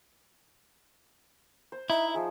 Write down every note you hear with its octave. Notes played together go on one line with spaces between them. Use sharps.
C5
D#4 E4 E5
F3 G#4